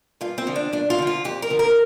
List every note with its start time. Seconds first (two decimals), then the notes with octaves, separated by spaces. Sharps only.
0.21 G2 F4
0.38 C4
0.46 D3 F3
0.56 D4
0.72 G2 D4
0.90 F4
0.99 D3 F3
1.07 F4
1.24 F2 G4
1.42 A#4
1.50 D3 F3
1.59 A#4